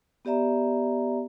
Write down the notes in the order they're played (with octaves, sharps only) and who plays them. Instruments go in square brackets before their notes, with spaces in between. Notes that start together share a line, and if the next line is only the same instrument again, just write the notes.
[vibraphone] B3 G4 D5 E5 A#5